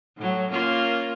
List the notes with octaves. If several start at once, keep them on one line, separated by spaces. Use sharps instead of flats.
A2 F#3
A#3 C#4 F4